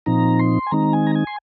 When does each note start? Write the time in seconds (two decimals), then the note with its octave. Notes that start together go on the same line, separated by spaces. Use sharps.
0.06 A#2 F3 C4 D#4 A#5
0.39 C6
0.67 G#5
0.71 D#3 G#3 C4 D#4 A#5
0.93 G#5
1.07 A#5
1.15 G#5
1.27 C6